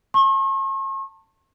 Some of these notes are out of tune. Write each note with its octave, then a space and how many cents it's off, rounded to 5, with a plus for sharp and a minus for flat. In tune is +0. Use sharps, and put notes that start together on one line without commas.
A5 +25 C#6 -45